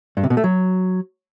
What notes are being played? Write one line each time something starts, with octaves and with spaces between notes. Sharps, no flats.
G2
C3
B2
A3
F#3